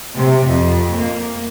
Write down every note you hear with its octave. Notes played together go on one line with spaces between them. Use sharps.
C3
F2
A#3